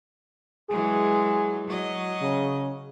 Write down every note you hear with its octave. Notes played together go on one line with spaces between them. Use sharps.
E3 F#3 G#3 G#4
F#3 D#5
C#3